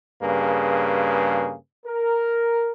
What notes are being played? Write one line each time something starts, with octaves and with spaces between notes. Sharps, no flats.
G2 C#3 A#3 G#4 B4
A#4